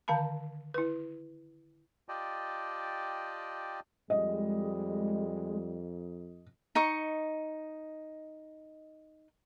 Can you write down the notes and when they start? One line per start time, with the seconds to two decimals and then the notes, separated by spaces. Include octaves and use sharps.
0.08 D3 D#3 F5 A5 B5
0.74 E4 B4
2.09 F4 G4 D5 D#5 G5 A5
4.10 F2 G3 G#3 D#5
6.75 D#4 D#5 C#6